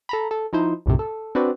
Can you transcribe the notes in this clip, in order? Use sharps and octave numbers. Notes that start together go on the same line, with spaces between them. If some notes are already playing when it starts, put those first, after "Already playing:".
A4 A#5 B5
A4
F3 D#4 E4 C5
B1 F#2 A2 C3
A4
C4 D4 F#4 B4 D5